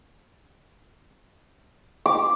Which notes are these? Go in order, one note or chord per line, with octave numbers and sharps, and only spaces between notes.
D6